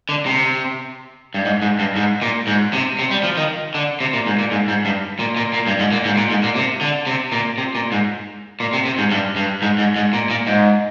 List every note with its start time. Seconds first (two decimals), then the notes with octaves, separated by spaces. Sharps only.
0.09 D3
0.26 C3
1.34 G2
1.45 G#2
1.62 G#2
1.79 G2
1.96 G#2
2.22 A#2
2.47 G#2
2.73 C3
2.99 C3
3.11 G3
3.24 F3
3.37 D#3
3.75 D3
4.01 C3
4.13 A#2
4.27 G#2
4.39 A#2
4.51 G#2
4.68 G#2
4.85 G2
5.19 A#2
5.36 A#2
5.54 A#2
5.67 G2
5.79 G#2
5.92 A#2
6.05 G#2
6.17 A#2
6.30 G#2
6.43 A#2
6.56 C3
6.81 D3
7.07 C3
7.32 A#2
7.58 C3
7.75 A#2
7.92 G#2
8.60 A#2
8.73 C3
8.85 C3
8.98 G#2
9.11 G2
9.36 G2
9.62 G#2
9.78 G#2
9.96 G#2
10.13 A#2
10.30 A#2
10.47 G#2